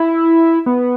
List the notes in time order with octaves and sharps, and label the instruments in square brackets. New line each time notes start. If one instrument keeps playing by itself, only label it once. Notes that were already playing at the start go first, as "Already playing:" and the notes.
Already playing: [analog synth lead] E4
B3